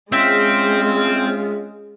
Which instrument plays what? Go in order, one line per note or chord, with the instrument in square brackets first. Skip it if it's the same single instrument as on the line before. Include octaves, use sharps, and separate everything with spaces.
[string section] G#3 [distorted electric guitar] C4 [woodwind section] C#4 F4 [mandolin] E5 G5